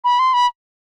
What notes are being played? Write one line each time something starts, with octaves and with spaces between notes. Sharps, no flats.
B5
C6
B5